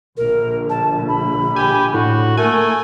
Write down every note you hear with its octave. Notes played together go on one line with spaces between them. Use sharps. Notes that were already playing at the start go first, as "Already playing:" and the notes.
A#1 D3 A#4
A5
B5
G4 G#5
A2 F#4
A3 A#3 A#4 G#5